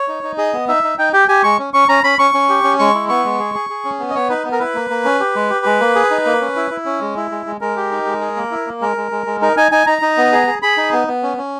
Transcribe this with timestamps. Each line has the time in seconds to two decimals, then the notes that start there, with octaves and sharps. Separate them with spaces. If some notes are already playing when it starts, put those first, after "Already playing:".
Already playing: C#5
0.08 D#4
0.23 D#4
0.38 G#4 D#5
0.53 B3
0.68 D#4 E5
0.83 D#4
0.98 D#4 G5
1.13 G4 G5
1.28 G4 G#5
1.43 G#3 C#6
1.59 C#4
1.74 C#4 C#6
1.89 C#4 A#5
2.04 C#4 B5
2.19 C#4 C#6
2.34 C#4
2.49 G4
2.63 C#4
2.79 G#3 C#6
2.94 E4
3.09 B3 C#6
3.25 G#3
3.39 G#4
3.54 G#4
3.70 G#4
3.84 C#4
4.00 B3
4.10 D#5
4.15 B3 C#5
4.30 D#4 B4
4.45 B3
4.52 A#4
4.60 E4 B4
4.75 A#3
4.90 A#3
5.05 C#4
5.20 G4
5.35 G#3
5.50 G4
5.65 G#3
5.80 A#3
5.95 G#4
6.11 D#4
6.26 A#3
6.41 C#4
6.56 E4
6.71 E4
6.86 C#4
7.01 G#3
7.16 E4
7.31 G#3
7.46 G#3
7.61 G#3 A#4
7.76 G4
7.91 D#4
8.06 G#3
8.21 G#4
8.37 A#3
8.51 E4
8.67 A#3
8.81 G#3 A#4
8.97 G#3
9.12 G#3
9.27 G#3
9.42 D#4 A#4
9.57 D#4 G#5
9.72 D#4 G#5
9.87 D#4 A#5
10.02 D#4
10.18 B3
10.32 G#4
10.47 G#4
10.62 G#4 B5
10.77 D#4
10.92 B3
11.08 B3
11.23 C#4
11.37 C#4